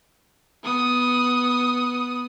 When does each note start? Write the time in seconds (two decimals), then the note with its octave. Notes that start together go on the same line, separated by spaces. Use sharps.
0.64 B3 D#6